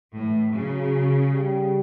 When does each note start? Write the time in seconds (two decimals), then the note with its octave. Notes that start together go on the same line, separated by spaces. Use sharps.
0.15 A2 E3
0.54 C#3 F#3
1.32 G3